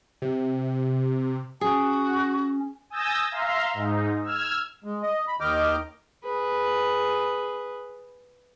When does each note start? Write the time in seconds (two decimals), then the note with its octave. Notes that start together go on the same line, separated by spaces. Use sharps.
0.22 C3
1.61 C#4 F#4 G#4
2.90 G#5 D#6 E6 G6 A6 A#6
3.31 E5 F5 A#5 C6
3.74 G#2 D#4
4.24 E6 F6 G#6
4.84 G#3
5.03 D#5
5.28 B5
5.40 D#2 D#3 D#5 D6 F6 G6
6.24 G#4 B4